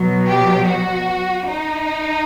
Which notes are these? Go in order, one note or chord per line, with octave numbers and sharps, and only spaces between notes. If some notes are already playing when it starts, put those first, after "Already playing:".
Already playing: B2 F#3
G4
F#4
D#4